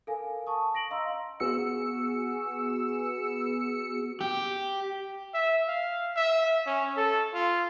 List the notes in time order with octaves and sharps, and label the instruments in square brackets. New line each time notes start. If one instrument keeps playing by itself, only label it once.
[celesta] A4 A#4 F5 G#5
A5 C#6 D#6
A#6 D7 F#7
D#5 F5 A#5 C6 E6
[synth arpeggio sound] B3 F#4 G#4 E6 C#7
[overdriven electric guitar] G4
[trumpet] E5
F5
E5
C#4
A4
F4